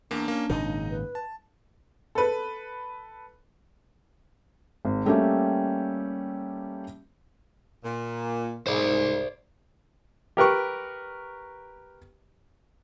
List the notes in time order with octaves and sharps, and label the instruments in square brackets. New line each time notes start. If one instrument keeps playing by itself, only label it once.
[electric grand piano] E2 A#3 [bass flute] D4
[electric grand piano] A#3 C#4
[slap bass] G#1 A#2 C#3 [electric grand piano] D#4 D#5
[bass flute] B4
[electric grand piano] A5
[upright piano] A4 B4
[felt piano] G#1
G3 A3 A#3 C#4 G4 E5
[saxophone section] A#2
[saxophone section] G#2 [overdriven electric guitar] C5 D5
[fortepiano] G4 A#4 B4 C#6